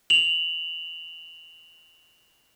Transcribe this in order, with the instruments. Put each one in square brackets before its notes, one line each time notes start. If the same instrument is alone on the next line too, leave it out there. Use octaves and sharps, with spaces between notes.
[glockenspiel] F7 F#7